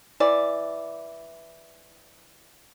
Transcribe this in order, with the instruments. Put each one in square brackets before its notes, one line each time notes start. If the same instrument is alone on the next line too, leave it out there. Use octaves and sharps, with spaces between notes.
[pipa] E3 D5